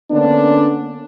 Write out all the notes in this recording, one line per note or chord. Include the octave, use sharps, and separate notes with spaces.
D3 A#3 B3 C#4 D4